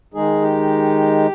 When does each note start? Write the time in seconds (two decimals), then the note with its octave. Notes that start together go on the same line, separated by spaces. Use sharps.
0.14 D#3 G#3 D#4 G#4
0.42 G4